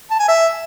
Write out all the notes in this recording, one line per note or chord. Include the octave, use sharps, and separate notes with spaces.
A5
G#5
E5